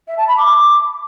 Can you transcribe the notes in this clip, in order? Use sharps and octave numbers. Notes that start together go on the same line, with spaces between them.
E5
A5
B5
D6